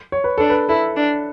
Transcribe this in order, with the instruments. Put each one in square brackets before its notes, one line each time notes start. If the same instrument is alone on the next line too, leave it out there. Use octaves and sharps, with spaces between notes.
[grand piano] C#5
B4
[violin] D4 [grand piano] A4
[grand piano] B4
[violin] E4 [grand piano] A4
[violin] D4